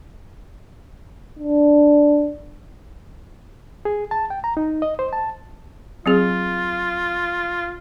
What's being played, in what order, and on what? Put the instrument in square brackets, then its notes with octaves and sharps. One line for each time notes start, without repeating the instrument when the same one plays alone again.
[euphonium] D4
[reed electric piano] G#4
A5
G5
A#5
D#4
D#5
C5
A5
[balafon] F#3 C4 G#4 [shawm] F4